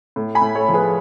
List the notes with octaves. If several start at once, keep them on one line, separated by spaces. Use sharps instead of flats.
A2
G#5 B5
A2
A4 C#5
F3
G#4 B4